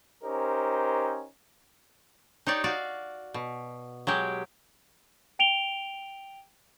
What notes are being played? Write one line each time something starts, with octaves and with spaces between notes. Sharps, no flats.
C#4 D#4 G4 A#4 C5
D#4 G4 C#5 D5
F#4 D5 F5
B2
F#3 G#3 G4
G5 D7 F7 G7